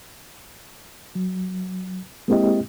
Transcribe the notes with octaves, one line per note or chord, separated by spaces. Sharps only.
F#3
G#3 A#3 C4 E4 G4 D#5